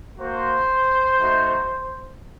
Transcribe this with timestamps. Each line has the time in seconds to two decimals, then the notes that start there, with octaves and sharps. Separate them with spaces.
0.19 A#3 F#4 C5
1.20 A3 D#4 F#4